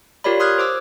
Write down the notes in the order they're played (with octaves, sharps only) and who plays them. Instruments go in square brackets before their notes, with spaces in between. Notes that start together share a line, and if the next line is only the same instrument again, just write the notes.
[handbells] F4 G4 A#4 C#5 D5 B5
C6 D#6 F6 F#6 G#6
C5 D6 E6